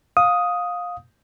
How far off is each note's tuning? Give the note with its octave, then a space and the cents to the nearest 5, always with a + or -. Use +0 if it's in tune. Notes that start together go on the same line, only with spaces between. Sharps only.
F5 +20 D#6 +5